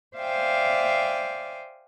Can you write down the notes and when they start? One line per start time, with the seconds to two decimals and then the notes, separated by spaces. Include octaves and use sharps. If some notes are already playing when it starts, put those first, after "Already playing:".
0.17 C5 D5 E5 F5 G5 G#5